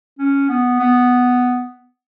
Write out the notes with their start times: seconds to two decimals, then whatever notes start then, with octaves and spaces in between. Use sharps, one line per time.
0.18 C#4
0.49 B3
0.80 B3